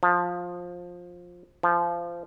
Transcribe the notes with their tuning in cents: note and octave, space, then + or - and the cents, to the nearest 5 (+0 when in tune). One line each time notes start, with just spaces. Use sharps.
F3 +15
F3 -20